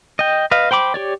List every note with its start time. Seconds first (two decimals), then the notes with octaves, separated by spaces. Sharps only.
0.19 D#5 G5
0.51 B4 D#5 F5
0.71 C5 G5 B5 D6
0.94 G4 C#5 D5